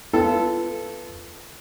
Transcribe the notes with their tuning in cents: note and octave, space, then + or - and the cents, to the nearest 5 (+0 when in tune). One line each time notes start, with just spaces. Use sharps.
B3 +0 F4 -30 A4 -5